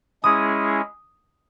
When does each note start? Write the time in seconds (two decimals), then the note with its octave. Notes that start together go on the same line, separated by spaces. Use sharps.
0.23 G#3 C#4 E4 G#4 D#6